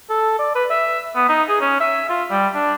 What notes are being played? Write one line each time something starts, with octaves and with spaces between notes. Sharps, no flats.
A4
D5
B4
E5
B3
D#4
G#4
C#4
E5
F4
G3
D4